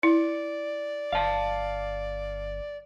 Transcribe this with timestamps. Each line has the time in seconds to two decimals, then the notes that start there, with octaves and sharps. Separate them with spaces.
0.03 E4 D5
1.12 G1 F5 A5